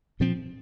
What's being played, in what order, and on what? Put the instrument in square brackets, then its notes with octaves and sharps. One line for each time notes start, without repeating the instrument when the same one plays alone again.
[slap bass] A#2 F3 C4